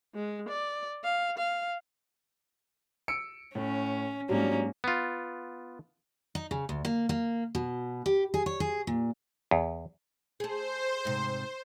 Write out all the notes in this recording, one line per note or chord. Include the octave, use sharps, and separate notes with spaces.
G#3
D5
F5
F5
E6 C#7 D7
A2 C#4
G#2 F#3 G3 A#3 C#4 D4
B3 F4
D#4
C#3
D2
A#3
A#3
B2
G4
G#4
C#5
G#4
A#2
E2
G#4 A4 C5
G#2 C3